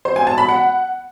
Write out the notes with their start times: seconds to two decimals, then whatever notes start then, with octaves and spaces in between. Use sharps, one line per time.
0.05 C5
0.16 G#5
0.27 A5
0.38 B5
0.49 F#5